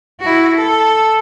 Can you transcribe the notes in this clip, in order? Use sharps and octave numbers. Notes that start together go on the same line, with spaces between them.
E4 F#4
A4